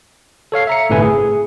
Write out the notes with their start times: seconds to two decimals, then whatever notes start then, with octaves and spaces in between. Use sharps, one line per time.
0.52 A4 C#5 F5 C7
0.67 E5 A#5 C#7
0.90 G1 A2 C3 A3 B4 G#5
1.02 G#4